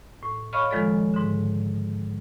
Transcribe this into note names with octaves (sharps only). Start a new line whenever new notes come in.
A2
C#5 D#5 F5 B5 C#6 F6
D#3 F3 G#3 F4 A4 D5
G#2 D3